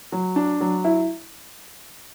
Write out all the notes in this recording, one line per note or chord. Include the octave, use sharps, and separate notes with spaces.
F#3
D4
F#3
E4